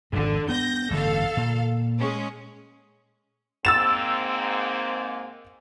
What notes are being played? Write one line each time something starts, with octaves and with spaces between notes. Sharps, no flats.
G#1 F2 D3
B3 D4 G6 A#6
A1 G2 D3 A4 F5
A#2
G#3 C#4
G#2 A#3 C4 E6 A6 E7